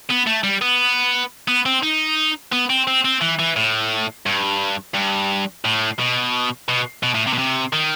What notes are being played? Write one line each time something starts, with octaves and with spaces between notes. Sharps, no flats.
B3
A3
G3
B3
B3
C4
D#4
B3
C4
C4
C4
E3
E3
A2
G2
G2
A2
B2
B2
B2
A2
C3
B2
C3
D#3